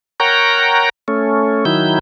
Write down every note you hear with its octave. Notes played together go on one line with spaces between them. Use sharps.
A#4 C#5 F#5 G5 A#5
A3 C#4
D#3 F#3 E4 G6